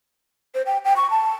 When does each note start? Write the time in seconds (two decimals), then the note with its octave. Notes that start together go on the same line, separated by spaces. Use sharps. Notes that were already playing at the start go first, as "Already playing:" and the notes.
0.55 C5
0.66 G5
0.85 G5
0.97 C#6
1.11 A5